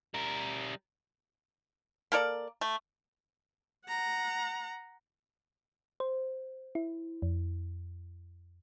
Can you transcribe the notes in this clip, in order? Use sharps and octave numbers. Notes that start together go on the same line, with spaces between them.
G3 A#4
A#3 A4 A#4 D5
A3
F#5 A#5
C5
E4
F2